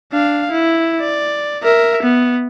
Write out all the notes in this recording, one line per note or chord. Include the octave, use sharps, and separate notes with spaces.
D4 F5
E4
D5
A#4 E5
B3